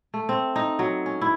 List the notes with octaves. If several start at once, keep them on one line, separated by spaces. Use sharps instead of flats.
A3
C4
D#4
F#3
C#4
E4